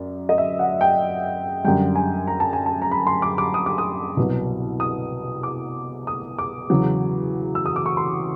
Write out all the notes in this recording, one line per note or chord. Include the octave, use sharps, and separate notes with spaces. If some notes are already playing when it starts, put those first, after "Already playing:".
Already playing: F#2 F#3 D5
D#5
E5
F#5
G5
F#2 D3 G3 G5
G#5
A#5
A5
G#5
A5
A#5
B5
C6
D6
D6
D#6
D6
D#6
C2 B2 F#3
D#6
D6
D#6
D6
E2 C#3 F#3
E6
D#6
D6
C#6
C6